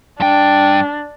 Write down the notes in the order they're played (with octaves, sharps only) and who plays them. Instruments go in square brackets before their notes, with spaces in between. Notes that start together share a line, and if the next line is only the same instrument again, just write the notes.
[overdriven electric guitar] G2 G5 [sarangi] D4